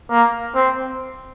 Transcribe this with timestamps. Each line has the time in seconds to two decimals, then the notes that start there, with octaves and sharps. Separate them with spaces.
0.10 A#3
0.55 C4